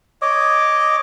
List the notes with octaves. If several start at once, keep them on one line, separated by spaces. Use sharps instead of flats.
C#5 D#5 D6